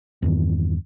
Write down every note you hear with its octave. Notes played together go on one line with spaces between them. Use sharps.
E2 G2 D#3